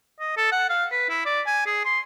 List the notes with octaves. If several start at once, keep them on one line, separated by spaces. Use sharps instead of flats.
D#5
A4
F#5
F5
B4
E4
D5
G#5
G#4
C6